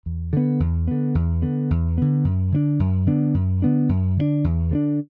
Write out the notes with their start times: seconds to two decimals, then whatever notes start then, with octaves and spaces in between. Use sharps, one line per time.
0.06 E2
0.33 D3 B3
0.60 E2
0.88 D3 B3
1.15 E2
1.42 D3 B3
1.70 E2
1.98 D3 B3
2.24 F#2
2.52 D3 B3 D4
2.80 F#2
3.06 D3 B3 D4
3.34 F#2
3.62 D3 B3 D4
3.89 F#2
4.17 D3 B3 D4
4.44 E2
4.71 D3 B3 D4